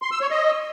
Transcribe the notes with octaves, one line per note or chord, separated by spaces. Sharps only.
C6
E6
C#5
D#5